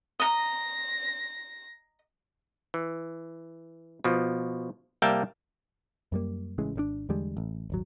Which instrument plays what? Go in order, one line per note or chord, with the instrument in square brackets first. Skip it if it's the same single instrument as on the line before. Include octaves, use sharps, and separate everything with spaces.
[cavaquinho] D#5 A#5 [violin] A#6
[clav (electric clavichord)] E3
B2 F3
C2 G3 A#3 E5 G5 A5
[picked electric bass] F#2 G3 A#3
A1 C#3 E3 G#3
G#1 C3 D4
E2 D3 G3 G#3
A1
D#1 G#1 F#3